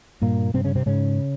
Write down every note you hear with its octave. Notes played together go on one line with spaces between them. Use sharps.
G2 A#2 A#3
G2 C3 C4
C#3 C#4
C3 C4
G#2 C#3 C#4